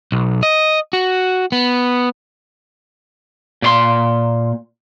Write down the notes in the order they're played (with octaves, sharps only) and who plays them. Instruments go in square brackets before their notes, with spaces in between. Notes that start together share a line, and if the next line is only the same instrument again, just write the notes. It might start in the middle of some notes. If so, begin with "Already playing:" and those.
[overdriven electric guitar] B1
D#5
F#4
B3
[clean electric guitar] A#2 D5 C6